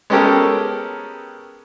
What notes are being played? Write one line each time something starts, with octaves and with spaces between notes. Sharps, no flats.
G#3 B3 C#4 G4 A4 A#4